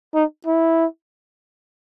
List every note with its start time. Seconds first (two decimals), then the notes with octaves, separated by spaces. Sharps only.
0.14 D#4
0.46 E4